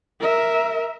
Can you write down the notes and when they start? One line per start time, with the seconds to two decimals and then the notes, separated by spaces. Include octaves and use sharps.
0.20 A#4 E5